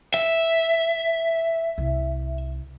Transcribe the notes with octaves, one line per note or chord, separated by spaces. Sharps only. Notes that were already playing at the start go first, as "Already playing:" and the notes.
E5
C2